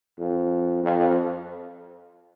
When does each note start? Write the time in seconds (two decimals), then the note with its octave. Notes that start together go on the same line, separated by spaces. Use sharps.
0.18 F2
0.83 F2